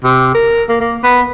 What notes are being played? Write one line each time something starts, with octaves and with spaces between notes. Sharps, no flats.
C3
A#4
A#3
A#3
B3